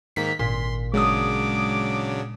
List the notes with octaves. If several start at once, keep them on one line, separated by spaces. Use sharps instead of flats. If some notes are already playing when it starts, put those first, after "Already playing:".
G#2 D#3 A#3 B6
G#1 A#2 C6
C#3 F#3 G#3 D4 D6 D#6